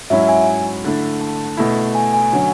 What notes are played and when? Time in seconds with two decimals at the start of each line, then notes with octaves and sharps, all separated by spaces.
0.10 G#2 F#3 C#4 E4 E5
0.29 G#5
0.84 D3 A3 E4
1.21 A5
1.57 B2 A3 E4
1.95 G#5
2.14 G#5
2.32 D3 F#3 C#4